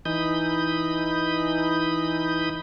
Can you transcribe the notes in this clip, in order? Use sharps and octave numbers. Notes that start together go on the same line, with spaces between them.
E3 D#4 B5 D#6 G6